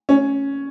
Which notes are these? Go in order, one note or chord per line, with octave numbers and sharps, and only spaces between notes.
C#4